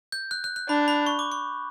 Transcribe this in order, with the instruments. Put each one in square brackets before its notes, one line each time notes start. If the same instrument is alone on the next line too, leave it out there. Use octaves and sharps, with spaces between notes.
[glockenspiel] G6
F#6
F#6
F#6
[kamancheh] D4 [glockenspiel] B5
[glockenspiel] B5
C#6
D6
C#6